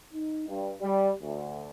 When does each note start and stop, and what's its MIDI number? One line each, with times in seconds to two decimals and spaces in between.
0.13 0.46 63
0.48 0.70 43
0.81 1.10 55
1.22 1.70 38